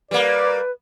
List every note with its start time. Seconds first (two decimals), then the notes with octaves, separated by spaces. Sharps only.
0.11 G3 A#3 B4 D5